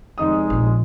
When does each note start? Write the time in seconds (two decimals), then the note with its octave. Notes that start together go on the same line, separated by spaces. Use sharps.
0.18 F1 G#3 D#4 D#6
0.50 A#1